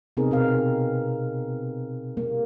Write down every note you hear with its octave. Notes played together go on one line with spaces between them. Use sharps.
C3 B3 C4 D#4 G#4 A#4
B2 C4 A#4 F5
G3 A#3